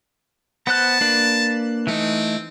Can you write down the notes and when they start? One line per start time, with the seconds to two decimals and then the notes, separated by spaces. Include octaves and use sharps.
0.67 B3 C5 A5 F#6
1.01 A#3 D4 B4
1.87 E3 A3 C4 D#4